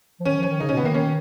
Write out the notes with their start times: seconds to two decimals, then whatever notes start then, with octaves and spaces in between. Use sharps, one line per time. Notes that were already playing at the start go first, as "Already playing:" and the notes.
0.20 F3
0.25 D#3 C#4
0.37 F3
0.43 C#4
0.49 D#3
0.60 C#3 D#4
0.69 C#4
0.72 B2
0.77 B3
0.83 D#3
0.85 A#3
0.94 D#3 C#4